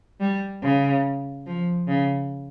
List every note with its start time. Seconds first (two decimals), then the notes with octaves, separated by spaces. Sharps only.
0.20 G3
0.63 C#3
1.46 F3
1.88 C#3